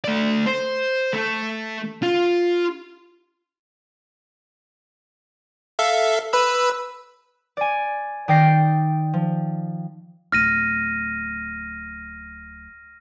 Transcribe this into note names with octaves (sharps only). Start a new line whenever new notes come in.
A3 D5
C5
A3
F4
A4 E5 F5
B4 B5 E6
D5 G#5
D#3 D5 G5 A#6 C7
F3
D1 F6 A#6 D#7